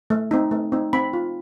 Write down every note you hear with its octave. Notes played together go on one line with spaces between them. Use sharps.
A3
C4 D#4
A3
C4 D#4
C4 B5
F4